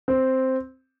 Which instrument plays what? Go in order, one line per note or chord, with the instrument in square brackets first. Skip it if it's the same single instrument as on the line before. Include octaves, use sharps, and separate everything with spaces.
[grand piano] C4